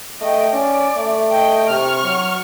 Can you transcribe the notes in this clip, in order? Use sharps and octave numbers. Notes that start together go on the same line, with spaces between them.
A3 D#5 G5
C#4 D5
A3
D#5 G5
C3 C#6 F6
F#3